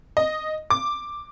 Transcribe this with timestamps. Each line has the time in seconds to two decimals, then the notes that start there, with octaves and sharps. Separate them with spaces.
0.17 D#5
0.70 D6